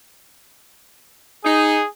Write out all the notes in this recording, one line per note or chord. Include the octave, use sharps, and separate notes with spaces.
D#4 G#4